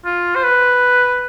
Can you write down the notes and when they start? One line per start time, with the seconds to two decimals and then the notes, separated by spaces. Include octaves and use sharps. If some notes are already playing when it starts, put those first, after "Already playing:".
0.06 F4
0.35 C5
0.44 B4